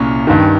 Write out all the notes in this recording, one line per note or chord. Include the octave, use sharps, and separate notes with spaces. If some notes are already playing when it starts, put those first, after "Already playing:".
Already playing: C2 A#2 C#4
G2 D#3